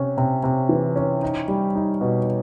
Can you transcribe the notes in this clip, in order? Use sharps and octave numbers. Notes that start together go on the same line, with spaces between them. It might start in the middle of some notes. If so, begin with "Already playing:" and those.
Already playing: C3 C#4
C3
C3
E3
C#4
D#4
G3
D#4
B2